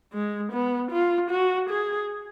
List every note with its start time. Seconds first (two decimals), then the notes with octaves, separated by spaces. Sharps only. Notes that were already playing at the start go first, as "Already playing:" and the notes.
0.13 G#3
0.52 B3
0.91 F4
1.30 F#4
1.70 G#4